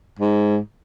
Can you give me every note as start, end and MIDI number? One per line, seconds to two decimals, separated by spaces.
0.19 0.59 44